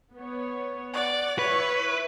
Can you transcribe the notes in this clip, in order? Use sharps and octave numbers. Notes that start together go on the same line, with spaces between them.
B3 C#5
D5 F#5
E4 B4 C#5